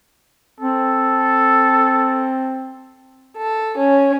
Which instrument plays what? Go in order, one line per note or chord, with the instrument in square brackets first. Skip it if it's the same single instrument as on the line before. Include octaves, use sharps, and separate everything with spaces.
[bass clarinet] C4 [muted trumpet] A4
[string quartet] A4
C#4